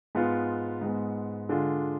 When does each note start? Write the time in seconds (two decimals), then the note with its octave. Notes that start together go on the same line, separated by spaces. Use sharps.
0.15 G#2 G#3 B3 F4
0.81 G#2 G#3 B3
1.49 D3 G#3 D4 F4